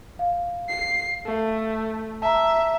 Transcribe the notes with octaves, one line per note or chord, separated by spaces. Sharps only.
F5
C7
A3
E5 A5 A#5